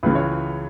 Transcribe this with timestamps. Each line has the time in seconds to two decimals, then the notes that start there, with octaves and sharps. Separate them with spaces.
0.03 C#2 C#3 E3 B4
0.15 C#5